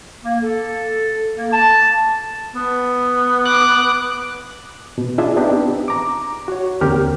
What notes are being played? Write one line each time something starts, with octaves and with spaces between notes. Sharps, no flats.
A#3
A4
A#3
A5
B3
D6 F#6
B2
D4 E4 F4 G#4 D#5 E5
B3 C4 D4 D#4 G4
A#5 D6
F#4 C#5
D#2 D3 C4 G4 A#4 F6